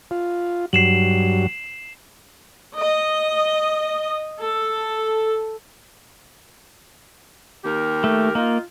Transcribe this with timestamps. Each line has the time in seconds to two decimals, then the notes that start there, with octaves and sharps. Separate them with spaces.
0.11 F4
0.73 G2 F#3 C7 E7 F#7
2.76 D#5
4.41 A4
7.65 D#2 G4 A#4
8.04 A3
8.35 A#3 D#4 F4